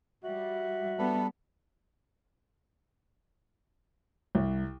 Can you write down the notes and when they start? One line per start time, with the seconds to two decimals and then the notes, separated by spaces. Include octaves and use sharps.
0.24 G3 F#4 E5
0.99 G3 B3 D4 A4 B4
4.35 C2